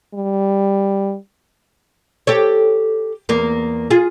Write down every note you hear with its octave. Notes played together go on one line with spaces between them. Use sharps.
G3
G4 A4 C#5
E2 A#3
F4 G#4